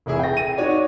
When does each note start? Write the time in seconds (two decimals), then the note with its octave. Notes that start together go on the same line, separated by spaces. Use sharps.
0.06 F1 E3 E4 G#4 E5
0.19 G5 A#6
0.37 D#7
0.58 D#4 F#4 C#5 D5